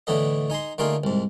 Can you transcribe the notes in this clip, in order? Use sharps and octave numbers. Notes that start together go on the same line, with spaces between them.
A2 D3 E3 B3 A4 D#5
D#4 G#5 A#5 C6
D3 A3 A#3 D#4 F4 G#4
C2 G#2